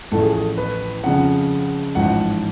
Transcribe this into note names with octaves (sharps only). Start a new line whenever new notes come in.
A1 A2 F3 A4
G#4
A4
B4
F2 C#3 F3 F#5
A1 G#2 F3 F#5